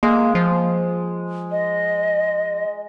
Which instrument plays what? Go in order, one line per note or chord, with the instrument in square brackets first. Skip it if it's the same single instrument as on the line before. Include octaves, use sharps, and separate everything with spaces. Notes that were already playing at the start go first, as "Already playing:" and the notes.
[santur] G#3 [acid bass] A#3
[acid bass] F3
[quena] D#5